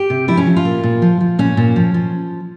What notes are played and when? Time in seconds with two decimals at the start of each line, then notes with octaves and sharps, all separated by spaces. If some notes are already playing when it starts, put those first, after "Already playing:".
Already playing: G4
0.10 C3
0.28 F3 E4
0.37 C#4
0.47 F3
0.56 F4
0.65 A#2
0.83 A#2
1.02 F3
1.21 F3
1.39 A#2 C#4
1.57 A#2
1.76 F3
1.94 F3